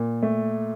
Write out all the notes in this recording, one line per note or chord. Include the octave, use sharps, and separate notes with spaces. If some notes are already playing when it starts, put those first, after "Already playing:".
Already playing: A#2
A3